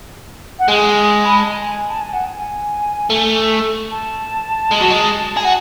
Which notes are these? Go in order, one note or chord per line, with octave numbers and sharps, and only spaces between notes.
F#5
G#3 G#5
B5
A5
G#5
A5
G#5
F#5
G#5
A3
A5
G#3
F#3
G#3
G#4
F#4